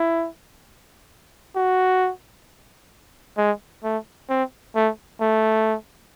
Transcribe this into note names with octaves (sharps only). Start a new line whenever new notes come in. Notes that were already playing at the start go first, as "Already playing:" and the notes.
Already playing: E4
F#4
G#3
A3
C4
A3
A3